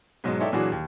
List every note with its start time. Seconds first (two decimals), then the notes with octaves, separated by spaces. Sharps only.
0.24 G#2 B2 F#3 G#3
0.40 D#4 A4 C#5 D5 E5 G5
0.52 A#2 E3 F#3 D4 F#4 G#4
0.72 D#2